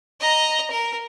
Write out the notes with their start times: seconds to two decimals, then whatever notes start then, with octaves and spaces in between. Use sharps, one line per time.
0.20 D#5 A#5
0.71 A#4